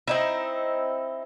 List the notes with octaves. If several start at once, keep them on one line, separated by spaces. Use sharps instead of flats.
C4 D#4 E4